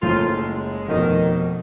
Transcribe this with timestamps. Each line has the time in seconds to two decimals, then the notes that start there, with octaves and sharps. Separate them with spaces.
0.02 F#1 F2 A2 D#3 F4
0.36 G#3
0.88 F1 B2 D#3